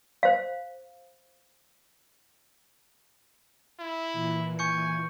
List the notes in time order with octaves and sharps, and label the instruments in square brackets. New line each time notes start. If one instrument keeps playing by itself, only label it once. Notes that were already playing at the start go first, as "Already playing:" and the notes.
[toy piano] C5 F5
[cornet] E4
[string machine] A#2 E3
[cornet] G#5 [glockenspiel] C#6 G6 C#7